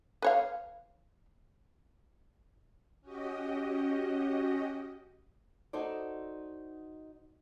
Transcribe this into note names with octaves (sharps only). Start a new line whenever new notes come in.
B4 C#5 F5
C#4 F#4 G4 D#5
D#4 F#4 A4 C5 D5